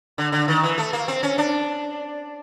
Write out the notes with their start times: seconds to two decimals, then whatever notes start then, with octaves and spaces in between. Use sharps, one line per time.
0.18 D3
0.32 D3
0.48 D#3
0.63 E3
0.78 A3
0.93 A#3
1.08 C4
1.23 C#4
1.38 D4